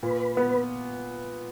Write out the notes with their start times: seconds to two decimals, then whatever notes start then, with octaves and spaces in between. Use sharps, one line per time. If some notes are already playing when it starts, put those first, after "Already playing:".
0.03 A#2 B4
0.37 B3